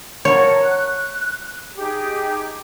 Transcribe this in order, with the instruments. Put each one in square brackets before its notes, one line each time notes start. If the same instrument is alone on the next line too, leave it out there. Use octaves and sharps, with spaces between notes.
[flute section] A#4 F#5 A5 [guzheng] C#5
[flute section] F#6
D#4 G4 G#4